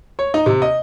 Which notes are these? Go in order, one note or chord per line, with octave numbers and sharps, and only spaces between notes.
C#5
D#4
C3
D#5